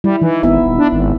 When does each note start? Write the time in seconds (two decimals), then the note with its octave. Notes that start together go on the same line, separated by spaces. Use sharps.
0.04 G3 E4
0.22 E3 D#4
0.43 G#1 B3 E4 E5
0.64 D#1
0.79 D4
0.93 G#1